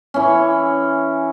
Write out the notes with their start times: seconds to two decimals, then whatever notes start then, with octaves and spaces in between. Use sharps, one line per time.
0.14 E3 C#4